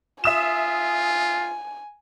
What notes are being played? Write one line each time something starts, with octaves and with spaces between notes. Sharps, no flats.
F4 E5 G#5 D#6 E7